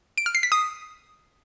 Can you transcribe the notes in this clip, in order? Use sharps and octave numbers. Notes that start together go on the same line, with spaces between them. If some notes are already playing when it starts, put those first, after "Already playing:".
D7
F6
C7
B6
D#6